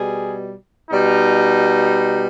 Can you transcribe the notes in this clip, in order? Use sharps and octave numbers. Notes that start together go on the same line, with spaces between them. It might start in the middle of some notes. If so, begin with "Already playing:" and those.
Already playing: B2 G3 G#4
B2 G3 D#4